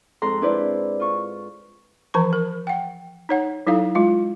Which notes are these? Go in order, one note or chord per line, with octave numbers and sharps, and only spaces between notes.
F2 G#2 A4 A#5 C6 F#6
D4 E4 B4 C5 D5
F4 C#6
E3 F3 A5 C#6
A#4
F#5 G5
D#4 C#5 F#5
F#3 D#4 E4 A4 F5
G#3 F4 F5